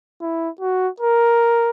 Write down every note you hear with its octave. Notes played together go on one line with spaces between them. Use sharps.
E4
F#4
A#4